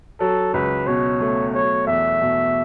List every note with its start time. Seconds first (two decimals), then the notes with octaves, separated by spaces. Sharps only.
0.20 F#3 A4
0.54 C#2 B4
0.87 B2 C#5
1.20 A3
1.54 F#3 C#5
1.87 E2 E5
2.21 B2